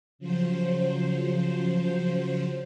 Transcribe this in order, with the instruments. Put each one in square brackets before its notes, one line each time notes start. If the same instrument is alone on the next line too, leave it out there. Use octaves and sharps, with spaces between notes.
[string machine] C#3 F3 F#3 C5